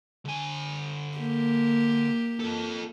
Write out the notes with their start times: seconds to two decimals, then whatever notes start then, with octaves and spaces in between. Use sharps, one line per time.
0.25 D3 G#5
1.18 A#3 G4
2.40 F4 A4